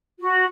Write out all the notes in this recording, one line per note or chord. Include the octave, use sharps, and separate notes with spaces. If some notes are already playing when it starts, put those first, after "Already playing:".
F#4